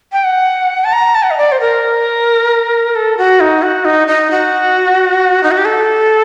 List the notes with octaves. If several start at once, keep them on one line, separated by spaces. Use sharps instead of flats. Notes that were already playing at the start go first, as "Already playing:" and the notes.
G5
F#5
A5
A#5
A5
F#5
D#5
D5
C5
A#4
A4
F#4
D#4
F#4
D#4
D#4
F#4
D#4
F#4
G4
A4